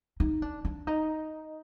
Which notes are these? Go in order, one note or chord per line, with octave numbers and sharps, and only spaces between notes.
D#4
D4
D4
D#4